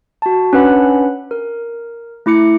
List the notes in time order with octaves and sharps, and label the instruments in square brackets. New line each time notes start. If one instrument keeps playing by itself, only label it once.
[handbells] F#4 A5
C#4 D4 B4 F#5 B5
A#4
A3 E4 D6 C#7